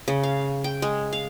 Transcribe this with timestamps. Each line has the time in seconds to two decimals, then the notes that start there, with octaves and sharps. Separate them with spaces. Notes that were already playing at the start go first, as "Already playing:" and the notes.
0.08 C#3
0.23 F5
0.64 G5
0.82 G#3
1.13 F5